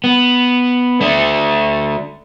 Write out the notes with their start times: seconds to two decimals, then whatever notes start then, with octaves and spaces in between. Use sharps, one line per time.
0.04 B3
1.01 A3 D4